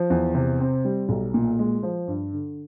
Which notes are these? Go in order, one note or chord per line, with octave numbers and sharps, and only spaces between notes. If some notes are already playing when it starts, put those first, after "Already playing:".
Already playing: F3
E2
C3
C4
G3
B1
A#2
G#3
F3
G2
D3